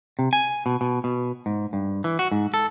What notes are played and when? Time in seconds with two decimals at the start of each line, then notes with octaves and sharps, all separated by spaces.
0.19 C3
0.33 G#5
0.66 B2
0.81 B2
1.04 B2
1.46 G#2
1.73 G2
2.04 E3
2.19 F#4
2.32 G#2
2.54 A4